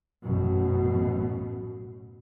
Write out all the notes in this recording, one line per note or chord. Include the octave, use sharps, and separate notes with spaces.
A1 F#2 B2